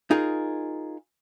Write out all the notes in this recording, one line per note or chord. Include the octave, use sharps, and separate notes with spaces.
D#4 F4 G#4 A#4